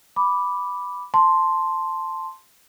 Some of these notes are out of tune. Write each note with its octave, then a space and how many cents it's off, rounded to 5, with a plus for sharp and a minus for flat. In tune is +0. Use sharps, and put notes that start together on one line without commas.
B5 +0 D6 +0
A5 +0 C6 +0